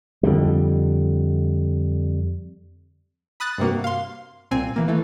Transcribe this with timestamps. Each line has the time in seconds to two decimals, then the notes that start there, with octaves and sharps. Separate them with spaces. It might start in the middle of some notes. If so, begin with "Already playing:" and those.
0.23 F2 D3 G3
3.40 B5 D#6 F#6 A6
3.58 G2 C3 A#3 F#4
3.84 F5 C6
4.51 C2 A#2 C4 G#5
4.76 E3 A#3
4.88 E3 A3